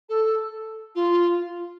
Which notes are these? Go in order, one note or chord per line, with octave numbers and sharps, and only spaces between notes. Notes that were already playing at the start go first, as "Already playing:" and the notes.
A4
F4